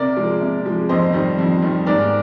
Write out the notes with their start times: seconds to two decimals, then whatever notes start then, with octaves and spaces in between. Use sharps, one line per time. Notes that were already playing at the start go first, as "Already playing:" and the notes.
Already playing: C3 A#4 D5
0.16 F3 G#3
0.40 C3
0.65 F3 G#3
0.89 F2 C5 D#5
1.13 D#3 G3
1.39 F2
1.62 D#3 G3
1.86 G#2 A#4 D5